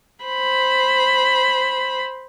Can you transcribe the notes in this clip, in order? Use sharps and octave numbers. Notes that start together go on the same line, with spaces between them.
C5 B5